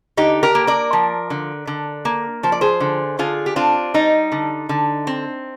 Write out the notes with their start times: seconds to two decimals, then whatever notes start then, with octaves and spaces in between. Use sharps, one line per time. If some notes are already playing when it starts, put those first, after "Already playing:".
0.17 D3 D#4 G4
0.43 G4 A#4
0.55 A#3
0.67 A#4 D5
0.93 F3
1.30 D3
1.67 D3
2.05 A#3
2.43 F3 C5
2.52 D5
2.61 G#4 C5
2.80 D3
3.19 D3 F4 G#4
3.46 G4
3.56 C4 D4 F4
3.94 G3 D#4
4.32 D3
4.69 D3
5.07 C4